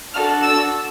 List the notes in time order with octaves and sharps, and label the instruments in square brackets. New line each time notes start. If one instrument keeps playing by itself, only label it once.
[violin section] D4 F#4 A4 F6
E6